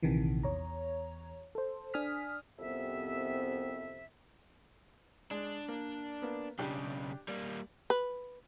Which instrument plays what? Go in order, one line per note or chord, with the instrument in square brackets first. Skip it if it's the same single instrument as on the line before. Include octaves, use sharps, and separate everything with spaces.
[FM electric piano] A#1 C3 D#3 E3
E2 C#5 A#5
A4 C5
D4 G#5 D#6 F6 B6
[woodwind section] C2 F2 C3 B3 C4 E5
[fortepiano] G#3 [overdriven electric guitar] D4
[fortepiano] A#3
A#3 B3
[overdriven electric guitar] B1 C#3 [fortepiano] D4 G4
[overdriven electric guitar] G3 A#3 [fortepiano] D5
[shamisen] B4